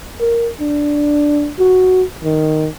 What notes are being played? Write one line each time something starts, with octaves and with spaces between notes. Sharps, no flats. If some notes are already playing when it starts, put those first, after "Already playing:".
A#4
D4
F#4
D#3